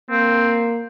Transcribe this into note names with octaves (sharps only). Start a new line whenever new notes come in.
A#3 C4